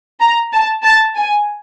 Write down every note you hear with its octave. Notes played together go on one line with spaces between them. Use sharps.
A#5
A5
A5
G#5